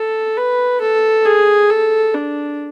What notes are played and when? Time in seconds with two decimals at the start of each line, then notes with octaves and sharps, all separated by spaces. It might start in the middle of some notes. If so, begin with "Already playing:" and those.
Already playing: A4
0.37 B4
0.81 A4
1.26 G#4
1.70 A4
2.14 D4